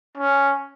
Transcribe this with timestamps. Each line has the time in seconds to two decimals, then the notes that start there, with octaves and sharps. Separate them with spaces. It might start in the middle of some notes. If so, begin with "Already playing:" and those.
0.18 C#4